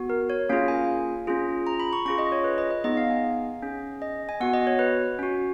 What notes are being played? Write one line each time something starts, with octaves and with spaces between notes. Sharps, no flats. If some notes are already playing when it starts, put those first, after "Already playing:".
Already playing: B3 F#4
A#4
C#5
A#3 C#4 F4 G#4 F5
G#5
C#4 F4 G#4
A#5
B5
C#6
C#4 F4 G#4 C#6
D#5
C#5
B4
D#5
D#5
B3 D#4 G#4 D#5
F5
G#5
C#4 G#4
D#5
G#5
B3 F#4 F#5
D#5
C#5
B4
C#4 F#4